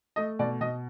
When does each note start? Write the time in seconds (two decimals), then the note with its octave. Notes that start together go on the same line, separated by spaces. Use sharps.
0.16 A3 D#5
0.39 B2 D5
0.61 B2 D#5